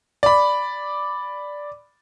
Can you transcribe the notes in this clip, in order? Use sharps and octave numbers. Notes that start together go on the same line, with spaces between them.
D5 B5